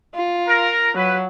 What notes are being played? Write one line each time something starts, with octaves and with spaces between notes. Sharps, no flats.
F4
A#4
F#3 B4